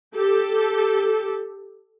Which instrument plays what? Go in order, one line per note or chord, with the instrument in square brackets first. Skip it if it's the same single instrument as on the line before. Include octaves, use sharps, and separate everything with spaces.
[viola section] G4 A4